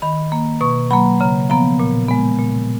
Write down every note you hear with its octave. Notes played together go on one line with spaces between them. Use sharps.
D#3 B5
A#3
B2 C#6
F#3 A#3 B5
C#3 A#5
F3 B3 A#5
A#2
G#3 B3
A#2